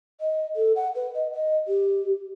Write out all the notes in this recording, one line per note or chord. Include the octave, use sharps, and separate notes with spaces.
D#5
A4
F#5
B4
D#5
D#5
G4